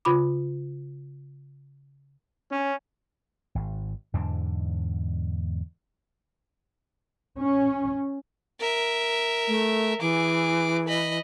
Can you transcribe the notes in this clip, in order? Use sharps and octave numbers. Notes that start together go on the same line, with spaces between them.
C#3 F4 B5 D6
C#4
G#1
E2 G#2 D3 D4
C#4
A#4 E5
A3
E3 G#4 D6
D#5 B5